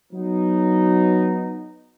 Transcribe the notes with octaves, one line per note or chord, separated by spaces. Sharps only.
F#3 B3 D#4